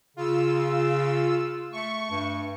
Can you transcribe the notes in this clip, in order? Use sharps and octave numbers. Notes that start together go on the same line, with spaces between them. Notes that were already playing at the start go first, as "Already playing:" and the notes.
C#3 F4 E6
A3 C#6
G2